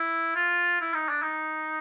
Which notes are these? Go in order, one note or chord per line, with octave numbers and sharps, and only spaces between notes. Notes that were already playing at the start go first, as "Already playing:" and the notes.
Already playing: E4
F4
E4
D#4
D4
D#4